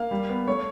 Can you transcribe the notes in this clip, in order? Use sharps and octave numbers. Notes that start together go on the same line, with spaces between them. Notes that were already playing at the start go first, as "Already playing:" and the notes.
Already playing: A#3 F5
G3
B3
A3 C#5